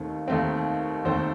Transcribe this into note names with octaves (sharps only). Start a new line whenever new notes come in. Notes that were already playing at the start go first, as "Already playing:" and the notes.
Already playing: D#2 D#3 A3 C4
D#2 D#3 A3 C4
D#2 D#3 A3 C4 A4 C5